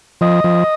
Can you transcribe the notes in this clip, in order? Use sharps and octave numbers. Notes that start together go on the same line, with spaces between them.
F3 D#5
F3